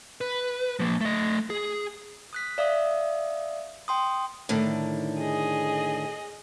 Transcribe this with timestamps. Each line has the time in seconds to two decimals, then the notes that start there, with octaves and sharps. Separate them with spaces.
0.21 B4
0.80 F3 A#3
1.01 A3 D#5
1.50 G#4
2.33 D#6 F#6 B6
2.58 D5 E5 F5 D#6
3.88 G5 C6 D#6
4.49 A2 D3 D#3
5.19 G#4 D#5